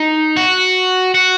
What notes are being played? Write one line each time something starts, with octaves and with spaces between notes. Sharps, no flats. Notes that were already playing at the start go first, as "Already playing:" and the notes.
Already playing: D#4
F#4
F#4